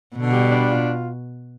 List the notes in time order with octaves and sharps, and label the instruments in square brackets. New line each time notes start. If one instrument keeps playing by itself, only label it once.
[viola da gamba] B2 [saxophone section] D3
[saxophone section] G3
D4
F4